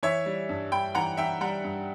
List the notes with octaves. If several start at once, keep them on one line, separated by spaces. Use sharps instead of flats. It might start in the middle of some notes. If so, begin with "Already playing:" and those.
E3 C#5 E5
G3
G2
G2 G5 B5
E3 F#5 A#5
E3 E5 G5
G3 F#5 A#5
G2